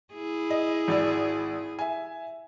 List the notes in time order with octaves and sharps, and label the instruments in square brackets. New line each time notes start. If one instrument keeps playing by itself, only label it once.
[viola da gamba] E4 G#4
[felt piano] D#5
G#1 D5 E6
E5 G#5